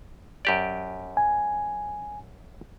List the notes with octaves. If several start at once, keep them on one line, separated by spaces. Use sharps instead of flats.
F#2 G4 D5
G#5